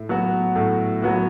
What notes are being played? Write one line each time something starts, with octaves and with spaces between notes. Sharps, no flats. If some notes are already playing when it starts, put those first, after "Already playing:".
Already playing: A2
F#3 B3 F#4
A2
F#3 B3 F#4